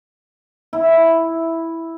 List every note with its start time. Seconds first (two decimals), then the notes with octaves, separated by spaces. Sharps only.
0.73 E4